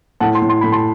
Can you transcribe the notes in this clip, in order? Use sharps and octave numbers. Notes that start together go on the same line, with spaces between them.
A2 F#5 A5
A5 C6
A2
C6
A2 B5
A5 C6